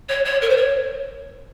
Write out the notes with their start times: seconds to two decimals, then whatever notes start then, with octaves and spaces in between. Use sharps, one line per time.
0.09 C#5
0.25 C#5
0.42 A#4
0.49 C5
0.57 C#5